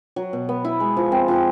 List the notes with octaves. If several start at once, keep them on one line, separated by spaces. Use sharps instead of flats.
F#3
B2
B3
E4
G#3
F3
C4
F3